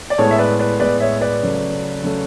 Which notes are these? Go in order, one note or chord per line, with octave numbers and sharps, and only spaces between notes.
D5
A2 G#3 B3 A4 C#5
E5
B4 D5
B4 D5
A2 G#3 B3 B4 D5
C#5 E5
B4 D5
C#3 F#3 A3
C#3 F#3 A3